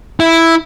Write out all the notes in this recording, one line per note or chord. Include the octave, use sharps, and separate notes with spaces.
E4